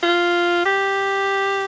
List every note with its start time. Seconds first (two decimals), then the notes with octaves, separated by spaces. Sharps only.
0.03 F4
0.65 G4